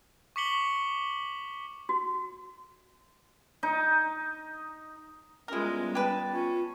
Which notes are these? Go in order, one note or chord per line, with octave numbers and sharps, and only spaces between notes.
C#6 D6 B6 C#7 F#7 G7
F#4
D#4
G3 G#3 B3 C#4 E4 F4 A#4
G4 B4 A5
C#4 F4